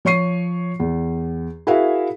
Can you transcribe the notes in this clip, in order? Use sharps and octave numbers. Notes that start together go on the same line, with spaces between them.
F3 C#5 C#6 C7 D#7
E2
E4 F#4 G#4 A#4 E5 F5